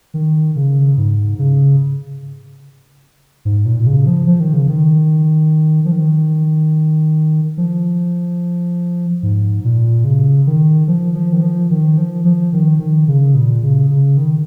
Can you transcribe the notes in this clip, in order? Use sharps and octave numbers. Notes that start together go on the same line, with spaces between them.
D#3
C#3
G#2
C#3
G#2
A#2
A#2
C#3
F3
F3
D#3
C#3
D#3
F3
D#3
F3
G#2
A#2
C#3
D#3
F3
F3
D#3
F3
D#3
F3
F3
D#3
D#3
C#3
A#2
C#3
C#3
D#3